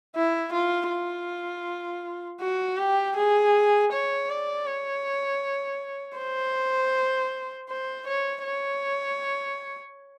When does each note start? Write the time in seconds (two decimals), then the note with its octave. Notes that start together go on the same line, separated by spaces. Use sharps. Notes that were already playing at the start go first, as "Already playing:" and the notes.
0.15 E4
0.53 F4
0.90 F4
2.41 F#4
2.78 G4
3.17 G#4
3.92 C#5
4.29 D5
4.67 C#5
6.17 C5
7.69 C5
8.07 C#5
8.44 C#5